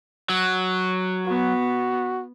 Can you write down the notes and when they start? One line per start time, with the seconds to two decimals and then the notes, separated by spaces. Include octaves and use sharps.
0.29 F#3
1.27 B3 F#4